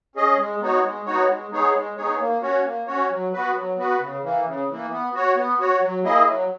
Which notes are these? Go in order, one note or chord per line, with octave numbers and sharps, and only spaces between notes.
C#4 G#4 D#5
G#3
B3 D#4 F#4 C#5
G#3
B3 D#4 F#4 C#5
G#3
B3 D#4 G#4 C#5
G#3
B3 D#4 G#4 C#5
A#3
C#4 F#4 C#5
A#3
C#4 F#4 C#5
F#3
B3 F#4 B4
F#3
B3 F#4 B4
C#3
E3 A#3
C#3
E3 A#3
B3
F#4 C#5
B3
F#4 C#5
F#3
A#3 E4 G#4 D#5
F#3